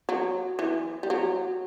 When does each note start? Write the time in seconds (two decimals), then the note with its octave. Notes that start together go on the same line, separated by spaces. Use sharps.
0.09 F#3
0.59 E3
1.03 G3
1.10 F#3